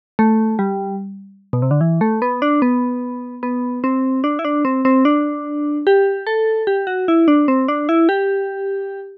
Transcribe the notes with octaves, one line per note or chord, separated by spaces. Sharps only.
A3
G3
B2
C3
D3
E3
A3
B3
D4
B3
B3
C4
D4
E4
D4
C4
C4
D4
G4
A4
G4
F#4
E4
D4
C4
D4
E4
G4